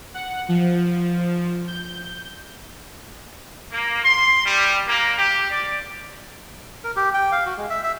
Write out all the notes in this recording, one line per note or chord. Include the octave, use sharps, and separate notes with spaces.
F#5
F3
G6
A#3
C6
G3
A#3
G4
D5
A#4
G4
G5
F5
F#4
G#3
E5
E5